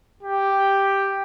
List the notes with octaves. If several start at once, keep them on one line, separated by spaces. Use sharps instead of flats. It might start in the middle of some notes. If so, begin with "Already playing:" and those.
G4